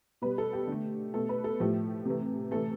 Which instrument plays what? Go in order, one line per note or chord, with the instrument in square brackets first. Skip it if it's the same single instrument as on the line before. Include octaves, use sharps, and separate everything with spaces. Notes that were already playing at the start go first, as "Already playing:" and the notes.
[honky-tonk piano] B2 G3 B4
A4
G4
D3 A3
B2 A3 A4
B4
A4
A2 F3 A3 G4
C3 E3 A3
C3 E3 A3 A4